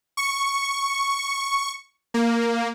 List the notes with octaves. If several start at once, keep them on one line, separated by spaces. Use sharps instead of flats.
C#6
A#3